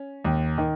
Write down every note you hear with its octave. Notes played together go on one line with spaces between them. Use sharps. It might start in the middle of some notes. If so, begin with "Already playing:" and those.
Already playing: C#4
D#2
D#3